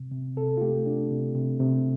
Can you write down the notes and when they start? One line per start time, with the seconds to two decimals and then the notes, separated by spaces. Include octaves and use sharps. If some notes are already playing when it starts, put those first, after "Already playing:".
Already playing: C3
0.12 C3
0.37 C3 A4
0.57 F4
0.61 A3 G4
0.86 D4
1.11 C3
1.35 C3
1.60 C3